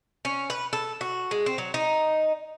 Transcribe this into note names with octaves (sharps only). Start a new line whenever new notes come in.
C#4
B4
A4
F#4
G#3
C4
F#3
D#4